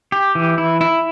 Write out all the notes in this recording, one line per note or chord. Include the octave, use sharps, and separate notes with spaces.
G4
E3
E4
E4